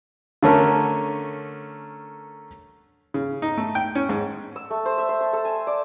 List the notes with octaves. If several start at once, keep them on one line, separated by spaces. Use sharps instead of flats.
D3 A3 C#4 A#4
C#3
D#4
A3
G5
C#4
G#2
E6
A3
C5
E5
C5
A5
A4
G#5
D5